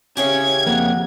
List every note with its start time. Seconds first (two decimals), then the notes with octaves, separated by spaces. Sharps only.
0.17 C#3 E3 C#4 G4 G#6
0.66 F2 A#3 F#5